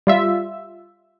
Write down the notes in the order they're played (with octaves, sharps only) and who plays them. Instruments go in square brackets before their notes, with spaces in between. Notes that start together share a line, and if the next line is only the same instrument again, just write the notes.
[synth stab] G3 F4 E5